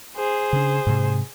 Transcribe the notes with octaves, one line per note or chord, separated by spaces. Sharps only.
G#4 C5
C#3 D4
G#2 C3